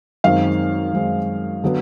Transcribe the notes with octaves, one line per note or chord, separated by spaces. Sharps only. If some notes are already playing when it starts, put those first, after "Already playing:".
F#2 D#3 G#3 C4 F5
F#2 D#3 G#3 C4
D3 F#3 B3